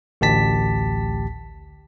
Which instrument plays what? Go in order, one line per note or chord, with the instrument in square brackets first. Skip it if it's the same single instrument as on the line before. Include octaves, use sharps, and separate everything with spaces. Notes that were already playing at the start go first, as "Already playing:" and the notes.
[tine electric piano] A1 D2 G4 A5 B6